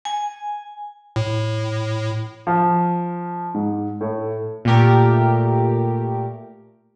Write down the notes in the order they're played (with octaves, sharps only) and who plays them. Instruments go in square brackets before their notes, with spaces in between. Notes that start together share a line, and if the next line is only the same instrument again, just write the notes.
[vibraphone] G#5
[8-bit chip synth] A2
[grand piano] F3
G#2
A2
[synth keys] A#2 A3 G4 A#4